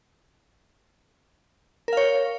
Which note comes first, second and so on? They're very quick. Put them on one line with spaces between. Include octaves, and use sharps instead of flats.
A#4 F5 C#5